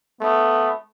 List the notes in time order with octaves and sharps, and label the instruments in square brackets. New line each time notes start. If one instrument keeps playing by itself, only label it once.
[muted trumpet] A3 [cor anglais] B3